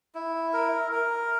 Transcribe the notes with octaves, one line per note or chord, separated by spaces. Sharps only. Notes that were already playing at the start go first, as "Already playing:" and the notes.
E4
A#4
A#4